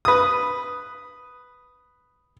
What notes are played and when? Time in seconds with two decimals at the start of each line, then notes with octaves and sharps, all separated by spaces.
0.05 B4 D#6